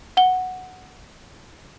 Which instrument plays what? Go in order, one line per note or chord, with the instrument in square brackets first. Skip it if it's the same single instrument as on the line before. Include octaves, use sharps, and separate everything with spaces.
[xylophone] F#5 G7